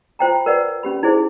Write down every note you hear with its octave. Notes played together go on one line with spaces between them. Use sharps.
F4 C5 G5 A#5
A#4 B4 D5 F#5
C#4 G4 B5
D#4 E4 G#4 C5